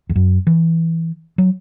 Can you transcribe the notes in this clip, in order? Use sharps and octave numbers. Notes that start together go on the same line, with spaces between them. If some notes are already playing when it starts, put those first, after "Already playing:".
E2
F#2
E3
F#3